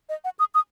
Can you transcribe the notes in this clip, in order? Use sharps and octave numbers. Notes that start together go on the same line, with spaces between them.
D#5
F#5
D#6
D#6